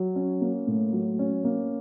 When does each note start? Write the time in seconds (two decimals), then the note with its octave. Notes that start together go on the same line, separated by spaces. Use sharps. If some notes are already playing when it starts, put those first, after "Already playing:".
Already playing: F#3
0.16 C#4
0.41 A#3
0.67 A2
0.93 F#3
1.19 C#4
1.44 A#3